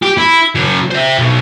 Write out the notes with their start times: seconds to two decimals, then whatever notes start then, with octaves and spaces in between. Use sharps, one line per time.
0.03 G4
0.17 E4
0.55 C#3 F#3
0.91 C5 E5
1.19 B1 B2